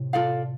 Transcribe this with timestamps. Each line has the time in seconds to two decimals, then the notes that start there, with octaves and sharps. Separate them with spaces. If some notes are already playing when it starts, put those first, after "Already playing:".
Already playing: A2 C3
0.13 F4 A4 D5 F5